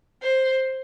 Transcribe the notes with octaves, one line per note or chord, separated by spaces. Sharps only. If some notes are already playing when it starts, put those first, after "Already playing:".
C5